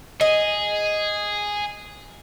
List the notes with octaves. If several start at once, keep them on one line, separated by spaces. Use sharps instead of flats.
G#4 D#5